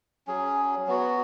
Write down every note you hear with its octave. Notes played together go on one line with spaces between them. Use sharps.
F#3 C#4 G#4
F#3 B3 F#4